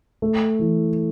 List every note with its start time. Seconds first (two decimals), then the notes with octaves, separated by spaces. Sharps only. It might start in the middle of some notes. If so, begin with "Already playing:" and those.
0.22 A3
0.59 E3